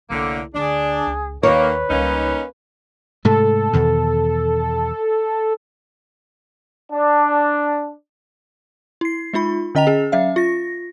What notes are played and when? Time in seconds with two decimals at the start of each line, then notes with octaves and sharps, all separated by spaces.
0.10 C2 A2 D3 A#3 E4
0.54 D2 D4 G#4
1.07 C#2
1.43 D#2 D#3 A#3 B4 C#5
1.90 C#2 G3 A#3 C#4 D#4
3.25 G#2 C3 A3 A4
3.73 E2 B2 D#3
6.91 D4
9.01 E4 C7
9.33 G#3 D#4 F4 B5
9.75 D3 C#4 D#5 G5 A#5 F7
9.87 C#4 G#4
10.12 F#3 C#4 E5 F5
10.36 F4 A#6